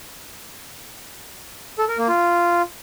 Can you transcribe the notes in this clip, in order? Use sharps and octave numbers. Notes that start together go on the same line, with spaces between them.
A4
A#4
A#3
F4